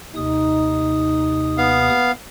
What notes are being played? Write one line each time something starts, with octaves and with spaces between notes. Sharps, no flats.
D#2 C3 D#4 D#6
B3 F5